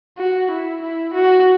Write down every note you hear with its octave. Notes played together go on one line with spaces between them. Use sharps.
F#4
E4
E4
F#4